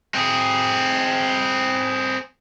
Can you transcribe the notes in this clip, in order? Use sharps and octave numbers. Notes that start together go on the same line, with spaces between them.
C4 G#4